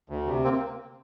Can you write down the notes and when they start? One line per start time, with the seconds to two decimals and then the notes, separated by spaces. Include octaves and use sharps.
0.09 D2
0.27 C3
0.44 A#3 C4